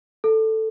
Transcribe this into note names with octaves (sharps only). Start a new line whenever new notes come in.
A4